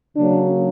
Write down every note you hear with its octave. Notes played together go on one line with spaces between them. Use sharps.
C#3 F#3 A#3 D4